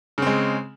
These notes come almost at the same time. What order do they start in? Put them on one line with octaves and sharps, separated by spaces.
C#3 C4 G#3